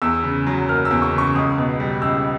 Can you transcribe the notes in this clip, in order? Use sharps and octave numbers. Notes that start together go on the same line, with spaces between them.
E2 E6
C#3
F#3
A#3 F6
E6
E2
C#6
C#3
C#6
C#2 D#6
B2
G3
C#2 E6